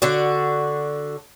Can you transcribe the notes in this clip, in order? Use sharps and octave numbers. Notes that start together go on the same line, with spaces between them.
D3 D4 F#4